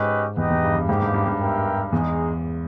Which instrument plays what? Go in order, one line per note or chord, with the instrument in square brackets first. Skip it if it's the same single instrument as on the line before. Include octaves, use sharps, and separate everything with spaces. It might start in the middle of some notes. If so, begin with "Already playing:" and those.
Already playing: [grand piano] G#2 [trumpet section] C#4 G4 B4 D#5
[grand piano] E2 [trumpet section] D#4 G4 B4 D#5 G5
[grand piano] E2
G2
G2
[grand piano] G#2 [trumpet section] A#3 D#4 G4 B4 G5
[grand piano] G2
G2
G2
[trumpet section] B3 G4 A#4 E5 G5
[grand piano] E2 [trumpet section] G#3 D#4 G#4